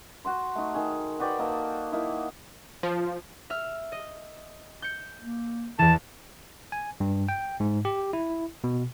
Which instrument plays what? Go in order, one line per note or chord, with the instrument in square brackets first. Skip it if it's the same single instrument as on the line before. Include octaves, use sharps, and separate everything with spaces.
[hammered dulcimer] F#4 F#5 C6
A3 D#4
D#3 G#4
F#4 B4 D5 G5
A#3 D#4 A4
A#3 D#4 E4
[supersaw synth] F3
[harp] E5 F6
D#5
G6 C#7
[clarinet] A#3
[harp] E2 E3 [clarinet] A5
[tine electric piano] G#5
G2
G5
G#2
G4
E4
B2